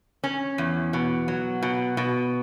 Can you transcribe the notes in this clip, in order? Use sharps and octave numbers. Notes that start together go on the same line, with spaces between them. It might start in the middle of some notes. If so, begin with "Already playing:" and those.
C#4
E2
B2
F#3
B2
B2